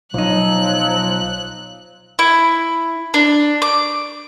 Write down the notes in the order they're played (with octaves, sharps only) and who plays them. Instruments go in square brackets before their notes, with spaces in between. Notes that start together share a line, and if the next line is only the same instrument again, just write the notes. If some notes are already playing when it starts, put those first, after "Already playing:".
[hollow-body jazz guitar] B1 D#4 [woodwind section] F3 F#3 [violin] F#6
[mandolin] E4
D4
D6